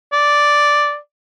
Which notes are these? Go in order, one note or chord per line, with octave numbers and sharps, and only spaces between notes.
D5